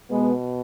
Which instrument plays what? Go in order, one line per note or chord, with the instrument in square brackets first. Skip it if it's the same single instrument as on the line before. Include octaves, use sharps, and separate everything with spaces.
[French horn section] B2 G#3 B3